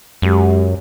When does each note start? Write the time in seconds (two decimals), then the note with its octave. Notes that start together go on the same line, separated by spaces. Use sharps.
0.22 F#2 G#3 G4